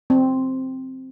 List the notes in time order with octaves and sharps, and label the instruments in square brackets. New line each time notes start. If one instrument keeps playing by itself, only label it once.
[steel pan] C4